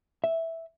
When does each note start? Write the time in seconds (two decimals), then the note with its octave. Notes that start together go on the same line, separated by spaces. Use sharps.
0.24 E5